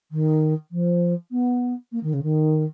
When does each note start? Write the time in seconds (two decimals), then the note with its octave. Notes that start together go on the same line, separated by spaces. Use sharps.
0.11 D#3
0.71 F3
1.31 B3
1.92 A#3
2.03 D#3
2.13 C#3
2.22 D#3